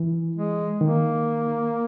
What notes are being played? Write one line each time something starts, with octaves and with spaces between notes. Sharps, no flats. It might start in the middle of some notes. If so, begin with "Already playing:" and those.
Already playing: E3
G#3
D#3 A#3